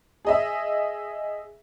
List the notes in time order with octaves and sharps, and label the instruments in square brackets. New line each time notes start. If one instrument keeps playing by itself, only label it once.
[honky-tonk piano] G#4 D#5 E5